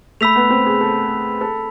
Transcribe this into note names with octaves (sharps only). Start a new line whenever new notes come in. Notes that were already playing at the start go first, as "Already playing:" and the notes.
A3 B5 E6 B6 F7
B3
C4
G#4
A4
A4